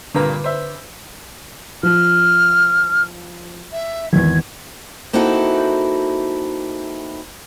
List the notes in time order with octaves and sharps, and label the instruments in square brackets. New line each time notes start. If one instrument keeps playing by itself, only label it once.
[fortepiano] G2 A#2 A#3 [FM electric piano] D3 B4
[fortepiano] C5 E5
[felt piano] F3 [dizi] F6
[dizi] E5
[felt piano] G#1 E2 [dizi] G#6
[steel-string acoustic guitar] A#3 C4 D#4 E4 F#4 A4